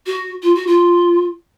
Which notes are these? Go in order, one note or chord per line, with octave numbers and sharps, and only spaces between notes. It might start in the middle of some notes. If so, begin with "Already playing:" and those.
F#4
F4
F#4
F4